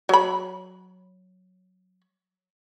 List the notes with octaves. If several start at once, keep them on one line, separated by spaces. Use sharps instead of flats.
F#3 B5